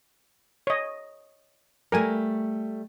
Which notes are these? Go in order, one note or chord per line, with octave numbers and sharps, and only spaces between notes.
C#5 D#5
G3 A3 A#4 G#5